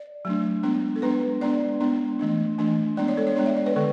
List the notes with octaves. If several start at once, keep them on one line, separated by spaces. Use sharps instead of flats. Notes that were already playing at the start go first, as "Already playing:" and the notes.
Already playing: D5
F#3 A3 D4
G#3 B3 D4
A4
G#3 B3 D4 B4
G#3 B3 D4 D5
G#3 B3 D4
E3 A3 D4
E3 A3 D4
G#3 B3 D4 D5
C#5
A4
C#5
G#3 B3 D4 D5
E5
D5
B4
D3 G#3 A4